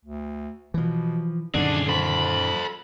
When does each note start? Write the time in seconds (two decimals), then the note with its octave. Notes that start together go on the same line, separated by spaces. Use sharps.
0.05 D2
0.74 B2 E3 F3
1.54 C2 F#2 A#2 D3 D#3 D4 G#4
1.89 A4 C5 B5